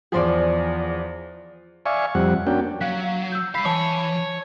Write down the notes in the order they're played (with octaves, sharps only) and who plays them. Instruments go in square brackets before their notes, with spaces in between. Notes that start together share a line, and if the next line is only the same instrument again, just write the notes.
[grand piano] E2 F3 [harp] G#4 C5 D5
[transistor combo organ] D5 E5 F5 G#5 C#6
F2 G3 C4 F#5
A#3 C#4 D4 F#4 G5
[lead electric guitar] F#3 [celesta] F5 F#6 B6
[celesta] F5
E6 G6
[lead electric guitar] G3 F5 [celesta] B5 B6 C7
[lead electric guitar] E3 [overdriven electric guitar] C#5 [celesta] A5